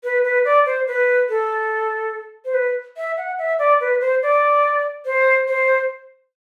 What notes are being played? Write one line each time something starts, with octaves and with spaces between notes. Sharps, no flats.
B4
B4
D5
C5
B4
A4
C5
B4
E5
F#5
E5
D5
B4
C5
D5
C5
C5